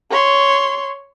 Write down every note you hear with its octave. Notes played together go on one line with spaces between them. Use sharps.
C#5 C6